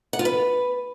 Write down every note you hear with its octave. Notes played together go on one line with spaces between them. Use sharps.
F#5
F4
B4